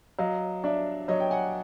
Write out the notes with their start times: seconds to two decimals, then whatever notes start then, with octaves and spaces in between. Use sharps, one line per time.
0.19 F#3 D#5 F5
0.63 D4 D5 E5
1.08 F#3 C#5 D#5
1.20 G5
1.30 F#5 G#5